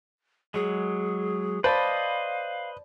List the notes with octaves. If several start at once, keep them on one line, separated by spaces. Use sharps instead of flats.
F#3 G#3 G#4
B4 C5 D5 D#5 F5 A5 B5